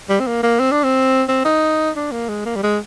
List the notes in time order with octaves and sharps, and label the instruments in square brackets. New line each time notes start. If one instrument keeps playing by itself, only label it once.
[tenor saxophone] G3
C4
A#3
A#3
C4
D4
C4
C4
D#4
D4
A#3
G#3
A#3
G3
G#3